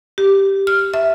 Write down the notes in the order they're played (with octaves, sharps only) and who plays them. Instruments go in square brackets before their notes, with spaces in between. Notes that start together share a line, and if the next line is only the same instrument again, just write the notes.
[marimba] G4
F6
E5